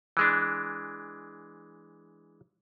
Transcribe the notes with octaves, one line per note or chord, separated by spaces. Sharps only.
E3 G#3 D4